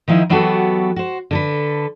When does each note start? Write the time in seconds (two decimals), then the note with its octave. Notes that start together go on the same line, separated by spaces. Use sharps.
0.08 D#3 F3 D#4 E4 D#5
0.29 E3 F#3 B3 F#4 G4 A4
0.96 F#4 C5
1.31 D3 A4 B4